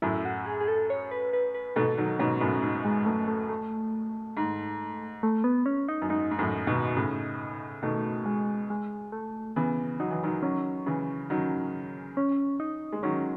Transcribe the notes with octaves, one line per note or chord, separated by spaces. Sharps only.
F#2 A2 E4
F#4
G#4
G#4
A4
C#5
B4
B4
B4
G#2 B2 A4
D#3 F#3
G#2 B2 C#4
F#2 A2
G#2
G#3
F#2 A3
A3
A3
G#2
A3
B3
C#4
D#4
F#2
G#2 D#4
G#2
F#2 A2
G#2 B2
A2 C#3
B2 D#3 A3
G#3
G#3
A3
C#3 E3 B3
F#3 D#4
E3
D#3 F#3
D#3 F#3 C#4
C#3 E3
D#3 F#3
C#4
D#4
G#3
D#3 F#3 C#4